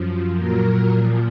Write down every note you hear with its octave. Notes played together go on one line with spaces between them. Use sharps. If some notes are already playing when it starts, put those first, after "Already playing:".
Already playing: F#2 F3
A#2 F#3 A#4
A#2 F3